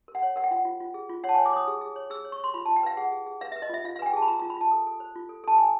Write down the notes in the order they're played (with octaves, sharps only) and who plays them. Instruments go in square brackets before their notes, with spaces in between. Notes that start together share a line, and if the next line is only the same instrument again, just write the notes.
[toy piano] A#4
F#5
C#5
A#4 F#5
G5
F4 F#5
F4
F4
G#4
F4
C#5 F#5
A5
G#5
C#5
D6
C#5 D#6
G#4
G#4
C#5
G#4 E6
C#5
C#6
C#5 C6
F4 B5
A5
F4
G5
B4 F5
G#4 F#5
G#4
G#4
B4 F5
E5
B4
D#5
F4 E5
F4 F5
F5
B4 G#5
G5
G#4 A5
B5
F4 A#5
A#5
F4
B5
F4 A5
A4
A4
C5
F4
A4
A4 A5
A4 G#5